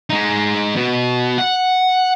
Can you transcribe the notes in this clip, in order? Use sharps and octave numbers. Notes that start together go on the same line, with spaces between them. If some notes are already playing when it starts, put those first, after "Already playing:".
G#3 D#4
B2
F#5